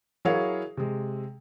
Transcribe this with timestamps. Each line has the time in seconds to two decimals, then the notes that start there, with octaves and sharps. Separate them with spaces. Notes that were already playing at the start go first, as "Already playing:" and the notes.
0.25 F#3 E4 G#4 A#4 C#5 F5
0.77 C3 G#3